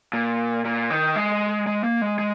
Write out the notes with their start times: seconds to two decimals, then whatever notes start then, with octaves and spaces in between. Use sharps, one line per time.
0.13 A#2
0.65 A#2
0.90 D#3
1.16 G#3
1.67 G#3
1.84 A#3
2.02 G#3
2.19 G#3